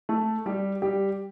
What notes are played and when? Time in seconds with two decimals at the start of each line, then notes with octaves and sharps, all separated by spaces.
0.09 A3 A4
0.46 G3 G4
0.82 G3 G4